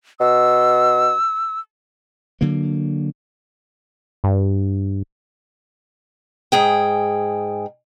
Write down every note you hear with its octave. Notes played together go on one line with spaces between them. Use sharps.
B2 E6
D3 F#3 A#3
G2
G#2 G#4 G5